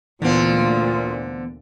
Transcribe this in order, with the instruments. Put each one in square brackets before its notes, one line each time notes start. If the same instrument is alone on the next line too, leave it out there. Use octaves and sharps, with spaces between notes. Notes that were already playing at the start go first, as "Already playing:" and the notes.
[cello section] D2 A#2 [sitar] D3 C4 [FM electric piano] E3 B3 [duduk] F4